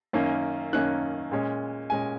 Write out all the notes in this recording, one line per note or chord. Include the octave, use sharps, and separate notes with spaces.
F#2 D#3 A#3 C#4
F#2 D#3 A#3 C#4 F#6
A#2 G#3 C#4
A#2 G#3 C#4 G#5